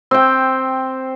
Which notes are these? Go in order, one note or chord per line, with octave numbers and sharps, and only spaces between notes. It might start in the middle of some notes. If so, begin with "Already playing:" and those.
C4 G5